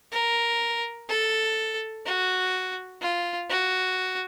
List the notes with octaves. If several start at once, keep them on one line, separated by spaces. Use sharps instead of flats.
A#4
A4
F#4
F4
F#4